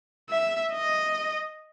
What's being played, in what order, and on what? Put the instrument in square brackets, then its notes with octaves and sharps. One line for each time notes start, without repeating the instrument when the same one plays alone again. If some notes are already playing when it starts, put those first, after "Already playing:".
[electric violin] E5
D#5